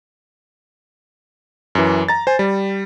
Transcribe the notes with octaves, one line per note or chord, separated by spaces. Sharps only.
F#2 E3
A#5 A6
C5 G#5
G3